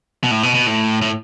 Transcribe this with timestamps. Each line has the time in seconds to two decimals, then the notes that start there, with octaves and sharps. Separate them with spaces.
0.24 B2
0.31 A2
0.43 B2
0.55 B2
0.67 A2
1.02 A2